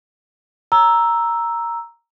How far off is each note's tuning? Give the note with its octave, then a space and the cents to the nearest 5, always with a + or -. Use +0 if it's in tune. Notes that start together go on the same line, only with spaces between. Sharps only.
A#5 +0 E6 +0